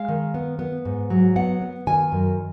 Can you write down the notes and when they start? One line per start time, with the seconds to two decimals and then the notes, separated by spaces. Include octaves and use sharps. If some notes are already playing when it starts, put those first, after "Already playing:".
Already playing: G#3 F5
0.08 D#3
0.34 B3
0.59 B3
0.85 G#2
1.10 F#3
1.36 B3 F#5
1.62 B3
1.87 D#3 G#5
2.12 F#2